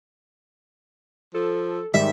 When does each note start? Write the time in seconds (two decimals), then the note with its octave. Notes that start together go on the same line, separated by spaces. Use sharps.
1.34 F3 A4
1.94 G#2 D#3 G3 E5